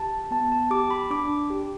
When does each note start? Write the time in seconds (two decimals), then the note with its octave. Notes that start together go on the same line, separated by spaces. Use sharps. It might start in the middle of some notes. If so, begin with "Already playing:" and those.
Already playing: G4 A5
0.31 B3 A5
0.52 A5
0.71 G4 D6
0.90 B5
1.10 D4 D6
1.50 G4